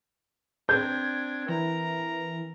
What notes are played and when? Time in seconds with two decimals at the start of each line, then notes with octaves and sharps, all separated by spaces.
0.69 C4 D4 G6 G#6
1.49 E3 A#4 A#5